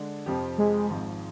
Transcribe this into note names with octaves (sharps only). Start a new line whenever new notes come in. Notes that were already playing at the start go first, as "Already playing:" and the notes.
Already playing: D3 G#3 D4
F2 C3 F3 C4 G4
G#3
G#1 G#2 F3 C4